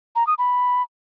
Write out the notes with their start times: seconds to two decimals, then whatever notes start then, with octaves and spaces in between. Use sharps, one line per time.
0.16 A#5
0.27 D#6
0.38 B5